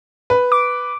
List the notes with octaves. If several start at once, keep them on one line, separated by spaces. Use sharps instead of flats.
B4
D6